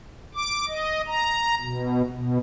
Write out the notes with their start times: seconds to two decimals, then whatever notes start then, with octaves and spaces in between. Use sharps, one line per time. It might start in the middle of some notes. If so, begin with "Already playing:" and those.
0.35 D6
0.68 D#5
1.07 A#5
1.61 B2
2.11 B2